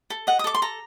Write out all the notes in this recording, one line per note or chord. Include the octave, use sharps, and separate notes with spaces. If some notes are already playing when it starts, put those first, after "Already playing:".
A4
D#5 F#5
D#6
A4 D6
C6
A4 A#5